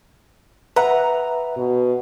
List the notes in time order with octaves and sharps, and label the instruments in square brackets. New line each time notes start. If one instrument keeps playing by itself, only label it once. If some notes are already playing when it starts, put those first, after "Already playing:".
[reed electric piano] B4 E5 F#5 [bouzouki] A#5
[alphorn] B2